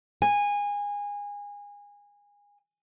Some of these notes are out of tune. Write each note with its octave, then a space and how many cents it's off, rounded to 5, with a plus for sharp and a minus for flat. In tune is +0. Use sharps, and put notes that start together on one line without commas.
G#5 -25